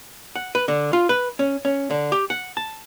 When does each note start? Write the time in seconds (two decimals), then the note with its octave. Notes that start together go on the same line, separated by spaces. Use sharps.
0.36 F#5
0.55 B4
0.68 D3
0.93 F4
1.09 B4
1.39 C#4
1.65 C#4
1.91 D3
2.12 G4
2.30 F#5
2.57 A5